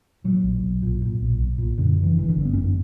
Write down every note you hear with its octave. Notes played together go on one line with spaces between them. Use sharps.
A#2 F#3
B1
B1
A#2
A#2
B1
B1
A#2
F#2 D3
C#3
E3
G1 E3
D3
G1
B3
F#2 C#4